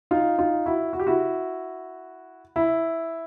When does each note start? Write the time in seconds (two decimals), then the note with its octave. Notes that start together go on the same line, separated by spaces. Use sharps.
0.11 D#4 F4
0.38 D#4 F4
0.66 E4 F#4
0.93 F#4
0.99 G4
1.07 E4 F#4
2.56 E4